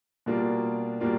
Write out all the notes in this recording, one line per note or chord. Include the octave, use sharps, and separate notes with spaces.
B2 G3 A#3 D4 F4
B2 G3 A#3 D4 F4